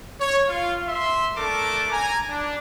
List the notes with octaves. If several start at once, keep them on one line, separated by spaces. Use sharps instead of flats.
C#5
F4 F5
E5 C6
A3 D4 A4 A#4 A5 D6
G#5 A#5
D4